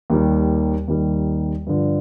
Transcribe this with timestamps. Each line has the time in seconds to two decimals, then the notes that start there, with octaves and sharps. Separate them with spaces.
0.10 D#2 D#3 G3
0.88 D#2 D#3 G3
1.67 G2 D3 F3